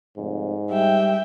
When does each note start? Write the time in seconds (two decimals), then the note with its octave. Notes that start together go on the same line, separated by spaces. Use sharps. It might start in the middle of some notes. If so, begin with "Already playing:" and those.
0.17 F1 G#2
0.71 G3 E5 G5